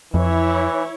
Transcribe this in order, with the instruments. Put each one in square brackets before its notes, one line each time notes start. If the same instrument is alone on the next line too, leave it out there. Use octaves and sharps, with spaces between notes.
[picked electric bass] F2 [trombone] E3 [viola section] E4 C#5